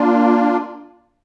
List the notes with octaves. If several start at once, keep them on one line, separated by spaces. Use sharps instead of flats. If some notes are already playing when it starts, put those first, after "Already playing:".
Already playing: A#3 D4 F4